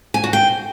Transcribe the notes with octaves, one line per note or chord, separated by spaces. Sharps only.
G#5
F#4
G5